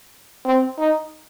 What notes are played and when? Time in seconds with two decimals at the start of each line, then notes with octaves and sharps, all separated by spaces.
0.46 C4
0.79 D#4